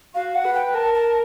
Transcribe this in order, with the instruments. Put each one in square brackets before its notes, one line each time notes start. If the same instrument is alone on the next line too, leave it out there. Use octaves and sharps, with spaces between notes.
[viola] F#4 [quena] F5
[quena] F#5
[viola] B4
[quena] G5
[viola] A#4 [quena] A5
[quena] A5